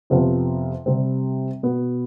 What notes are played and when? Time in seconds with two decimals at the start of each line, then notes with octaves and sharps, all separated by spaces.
0.10 F2 C3 F3 B3
0.86 C3 G3 C4
1.63 B2 B3